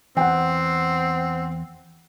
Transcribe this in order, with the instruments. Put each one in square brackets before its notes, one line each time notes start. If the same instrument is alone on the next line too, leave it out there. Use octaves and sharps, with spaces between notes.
[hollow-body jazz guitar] E2 [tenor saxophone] C4 [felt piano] F#5 G5